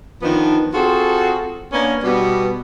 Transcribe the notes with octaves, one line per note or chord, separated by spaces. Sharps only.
D#3 F3 B3 D4 D#4
C4 F4 F#4 G#4 A4
A#3 B3 C#4 D4
B2 G3 B3